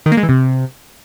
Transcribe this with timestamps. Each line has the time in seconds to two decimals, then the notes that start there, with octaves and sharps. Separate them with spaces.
0.06 D#3
0.12 A#3
0.17 G#3
0.23 E3
0.29 C3